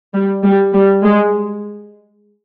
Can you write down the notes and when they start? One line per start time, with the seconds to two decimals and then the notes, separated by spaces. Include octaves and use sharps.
0.14 G3
0.44 G3
0.73 G3
1.04 G#3